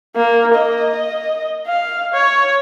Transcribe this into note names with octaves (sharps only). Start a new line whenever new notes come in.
A#3
D#5
F5
C#5